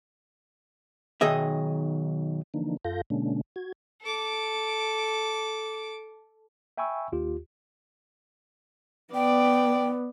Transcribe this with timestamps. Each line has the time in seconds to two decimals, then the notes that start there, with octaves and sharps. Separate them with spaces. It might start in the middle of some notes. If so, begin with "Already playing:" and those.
1.21 B1 D#3 G#4 D#5 E5
2.54 D3 E3 F3 A#3 D4 D#4
2.85 F#2 F4 A4 F5 G6 A#6
3.10 B2 D3 G#3 A#3 C#4 D4
3.56 F#4 G#6
4.01 A4 D6
6.78 E5 G5 G#5 B5 C#6 E6
7.12 D#2 F4 G4
9.14 B3 D5 G5